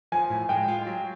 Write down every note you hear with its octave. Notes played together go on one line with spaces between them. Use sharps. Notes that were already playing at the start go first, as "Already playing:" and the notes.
F3 G#5
A2
G#3 G5
F4
F#3